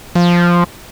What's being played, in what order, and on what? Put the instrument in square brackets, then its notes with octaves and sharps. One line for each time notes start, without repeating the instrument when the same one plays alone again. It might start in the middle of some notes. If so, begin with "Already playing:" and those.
[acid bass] F3